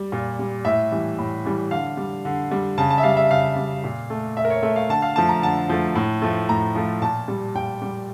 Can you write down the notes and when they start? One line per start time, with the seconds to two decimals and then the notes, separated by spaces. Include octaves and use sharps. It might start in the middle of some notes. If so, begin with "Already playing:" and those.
Already playing: G3
0.12 A#2
0.39 G3
0.65 A2 E5
0.91 E3 G3
1.19 A2
1.45 E3 G3
1.71 D3 F5
1.97 G3
2.25 D3
2.51 G3
2.78 C#3 A5
2.90 A5
2.98 E5
3.03 G3 F5
3.17 E5
3.31 C#3 F5
3.56 G3
3.84 A#2
4.10 A3
4.36 A#2 E5
4.45 A#4
4.50 C#5
4.62 A3 E5
4.76 F5
4.89 D3 A5
5.02 F5
5.16 F3 A3 A5
5.29 A#5
5.42 D3 A5
5.69 F3 A3
5.95 A2
6.22 F3 A3
6.49 A2 A#5
6.75 F3 A3
7.01 A#2 A5
7.28 G3
7.55 A#2 G5
7.82 G3